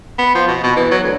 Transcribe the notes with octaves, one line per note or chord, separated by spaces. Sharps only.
B3
F3
B2
B2
E3
F#3
D2